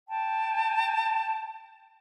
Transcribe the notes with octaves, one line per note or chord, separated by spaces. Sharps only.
G5 A5